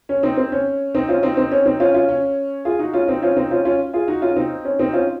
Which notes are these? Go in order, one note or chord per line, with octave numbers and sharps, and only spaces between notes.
C#4
C4 D#4
C4
C#4
C4 D#4
C#4 F4
C4 D#4
C4 D#4
C#4
C4 D#4
C#4 F4
C#4 F4
C#4
F4 G#4
D#4 F#4
C#4 F4
C4 D#4
C#4 F4
C4 D#4
C#4 F4
C#4 F4
F4 G#4
D#4 F#4
C#4 F4
C4 D#4
C#4
C4 D#4
C#4 F4